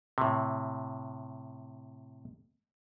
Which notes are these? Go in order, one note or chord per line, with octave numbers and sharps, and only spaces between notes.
A2 C3